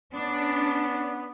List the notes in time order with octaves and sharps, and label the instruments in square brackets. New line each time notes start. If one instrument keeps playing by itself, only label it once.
[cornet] B3 [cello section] C#4 D4